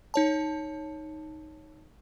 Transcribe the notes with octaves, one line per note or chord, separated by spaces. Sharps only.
D#4 C#5 A5